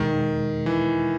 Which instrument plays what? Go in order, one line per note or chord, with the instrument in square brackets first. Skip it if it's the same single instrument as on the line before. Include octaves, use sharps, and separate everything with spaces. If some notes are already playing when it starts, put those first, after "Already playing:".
Already playing: [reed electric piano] E2 B2 G#3 [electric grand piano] D#3
[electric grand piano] E3